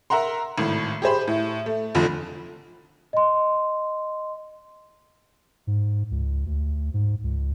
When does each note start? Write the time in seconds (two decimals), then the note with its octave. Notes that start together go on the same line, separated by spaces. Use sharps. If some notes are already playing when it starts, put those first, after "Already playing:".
0.10 A#4 E5 F#5 A#5 C6
0.58 G#1 A2
1.02 G4 G#4 C5 B5
1.27 A2
1.66 A3
1.95 F1 F2 D3 F3
3.13 D#5 C6
5.67 G#2
6.11 C#2
6.46 D2
6.94 G#2
7.24 C#2